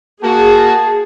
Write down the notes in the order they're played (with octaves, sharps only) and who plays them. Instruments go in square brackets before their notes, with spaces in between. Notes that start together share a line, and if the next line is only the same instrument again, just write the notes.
[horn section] A#3 F#4 [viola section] G#4 [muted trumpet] A5